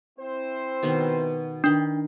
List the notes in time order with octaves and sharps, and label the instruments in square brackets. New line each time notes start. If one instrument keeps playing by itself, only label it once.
[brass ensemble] C4 E4 C5
[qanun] B2 D#3 B3
[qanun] D#3 B5 C6 [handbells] D4